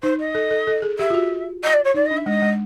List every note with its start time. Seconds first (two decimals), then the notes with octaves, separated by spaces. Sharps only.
0.03 D#4 C5
0.19 D#5
0.35 A4
0.51 A4
0.67 A4
0.82 G#4
0.98 G4 E5
1.10 F4
1.14 F#4
1.63 D#5
1.73 D5
1.84 C#5
1.94 D#4 D5
2.06 D#5
2.11 D4
2.17 E5
2.26 G#3 D#5
2.42 G#3